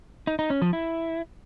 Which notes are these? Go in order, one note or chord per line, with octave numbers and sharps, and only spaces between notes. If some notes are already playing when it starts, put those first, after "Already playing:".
D#4
D#4
C#4
F3
E4